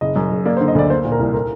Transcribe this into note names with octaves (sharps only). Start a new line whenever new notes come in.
F#1 D#5
F#2
F#1
A#3 D5
C5
D3
D#5
D2 D5
A#3 C5
A#2
A#4
C2
A#4